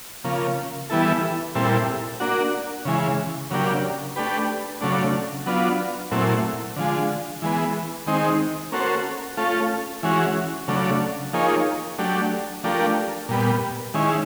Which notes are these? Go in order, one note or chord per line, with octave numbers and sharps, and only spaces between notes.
C#3 F3 A#3
E3 G3 B3 E4 A4
A#2 G3 C4 E4 A4
A#3 D4 F#4
C#3 E3 G#3
C#3 F#3 A#3 D4 G4
A3 D4 G4 B4
C#3 F#3 A3 D4
F#3 B3 D4 F4
A#2 F#3 A3 C4 E4
D3 F3 G#3
E3 G#3 B3
D#3 G#3 C4 D#4
A#3 C#4 F#4 A4 C5
A3 C#4 F4 A4
E3 G#3 C#4 F#4
C#3 F#3 A3 D4
F3 A#3 D#4 G#4 C#5
F#3 A3 D4 G4
F3 A3 D4 G4 A#4
A#2 G3 B3
D#3 G#3 C#4 E4